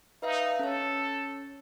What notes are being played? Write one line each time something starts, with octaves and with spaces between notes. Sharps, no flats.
D#4 B4 E5 F5
C#4 A4 C#5